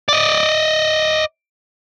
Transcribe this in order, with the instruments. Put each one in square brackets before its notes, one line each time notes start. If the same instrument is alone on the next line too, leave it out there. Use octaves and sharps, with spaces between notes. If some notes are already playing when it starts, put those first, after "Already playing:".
[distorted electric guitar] D5 D#5